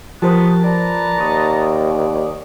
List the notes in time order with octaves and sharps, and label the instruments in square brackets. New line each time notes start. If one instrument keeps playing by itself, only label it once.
[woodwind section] C#3 G#3 B3 [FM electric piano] F3 A#4 C5 [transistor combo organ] G4 A5
[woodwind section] B4 A5 A#5 [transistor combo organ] D5
[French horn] D#2 [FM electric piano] C#6 D#6